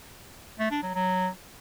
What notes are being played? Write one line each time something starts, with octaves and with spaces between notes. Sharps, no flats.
A3
D4
F#3
F#3